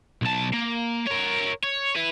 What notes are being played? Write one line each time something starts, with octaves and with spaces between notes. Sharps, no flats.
B1 A5
A#3
A#4 C#5
C#5
E4 B4